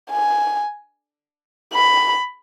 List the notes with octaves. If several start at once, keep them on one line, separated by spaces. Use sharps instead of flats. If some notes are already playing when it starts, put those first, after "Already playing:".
G#5
B5